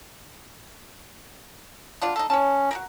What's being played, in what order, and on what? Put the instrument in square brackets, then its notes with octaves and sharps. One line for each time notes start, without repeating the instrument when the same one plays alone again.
[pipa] B2 D4 F4
D#4 A4
[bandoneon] C#4 [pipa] C#5 A5
[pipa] F#4 G4 A#4